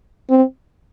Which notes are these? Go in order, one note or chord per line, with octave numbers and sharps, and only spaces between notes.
C4